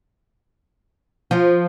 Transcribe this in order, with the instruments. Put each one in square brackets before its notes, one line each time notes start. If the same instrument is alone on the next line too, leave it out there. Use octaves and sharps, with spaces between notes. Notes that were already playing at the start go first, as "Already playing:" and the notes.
[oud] F3